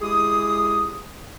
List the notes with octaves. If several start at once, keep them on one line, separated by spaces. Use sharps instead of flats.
G#3 E4 G4 G#4 D#6